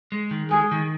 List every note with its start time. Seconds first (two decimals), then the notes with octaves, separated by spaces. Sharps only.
0.12 G#3
0.31 D#3
0.51 G#3 G#4
0.72 D#3